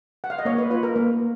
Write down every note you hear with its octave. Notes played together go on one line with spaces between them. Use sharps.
F#5
F5
D#5
A#3 C#5
B4
F4 B4
A#4
A#3